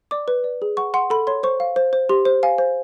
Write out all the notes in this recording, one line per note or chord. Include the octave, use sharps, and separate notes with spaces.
D5 D6
B4
D5
G#4
F#5 C#6
F#5 C6
A4 B5
C#5 C6
C5 C#6
F5
C5
C5
G4 C6
C5
F5 G#5
C5